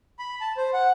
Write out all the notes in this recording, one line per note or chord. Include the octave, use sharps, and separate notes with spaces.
B5
A5
C5
F#5